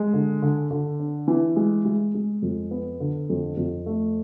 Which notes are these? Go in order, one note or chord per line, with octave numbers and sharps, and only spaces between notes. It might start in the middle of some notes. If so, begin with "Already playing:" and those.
Already playing: G#3
D3
D3
D3
D4
E3
G#3
G#3
G#3
F2
B3
D3
F2
F2
A3